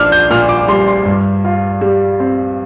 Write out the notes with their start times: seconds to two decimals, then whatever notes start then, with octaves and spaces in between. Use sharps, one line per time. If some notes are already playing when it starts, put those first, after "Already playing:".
Already playing: A#1 D4 D6 F6
0.12 G6
0.30 A#2 F6
0.49 D6
0.68 G3 C6
0.87 C6
1.05 G2
1.44 F4
1.81 G3
2.20 C4